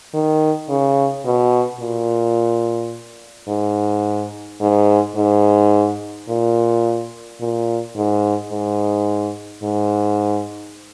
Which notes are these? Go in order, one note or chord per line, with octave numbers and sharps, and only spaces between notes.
D#3
C#3
B2
A#2
G#2
G#2
G#2
A#2
A#2
G#2
G#2
G#2